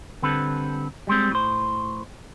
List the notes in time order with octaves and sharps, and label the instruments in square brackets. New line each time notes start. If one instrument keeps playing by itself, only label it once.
[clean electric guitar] D3 G3 C4 A4 B4
G3 G#3 C4
A2 C5